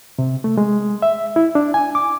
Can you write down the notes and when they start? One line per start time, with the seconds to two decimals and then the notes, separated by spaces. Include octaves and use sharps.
0.19 C3
0.44 A3
0.57 G#3
1.02 E5
1.36 E4
1.55 D4
1.74 G#5
1.95 D6